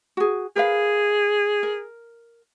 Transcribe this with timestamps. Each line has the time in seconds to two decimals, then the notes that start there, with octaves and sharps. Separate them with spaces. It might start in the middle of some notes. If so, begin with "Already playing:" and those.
0.17 F#4 G#4
0.56 G#4 A#4 B4 F5
1.63 A#4